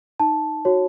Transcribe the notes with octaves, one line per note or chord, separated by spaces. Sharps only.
D#4 A5
F#4 C#5